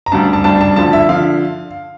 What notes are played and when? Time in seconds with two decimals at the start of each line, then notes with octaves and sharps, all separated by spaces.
0.06 A#5
0.12 D2 C#3 G3 D4 A5
0.33 A5
0.44 D2 C#3 G3 D4 A5
0.61 A5
0.76 D2 D3 F3 A5
0.93 E5
1.09 D3 F3 F5